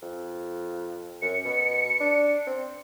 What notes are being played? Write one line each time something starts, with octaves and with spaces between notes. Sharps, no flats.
F2
F#2 C#7
B2
D4
C4